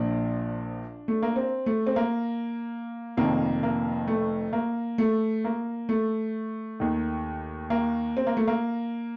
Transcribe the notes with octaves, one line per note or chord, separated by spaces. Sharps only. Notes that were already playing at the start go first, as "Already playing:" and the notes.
Already playing: A#1 A#2 F3 D4
A3
A#3
C4
A3
C4
A#3
F1 F2 D#3 A#3
A#3
A3
A#3
A3
A#3
A3
D#2 D#3
A#3
C4
A#3
A3
A#3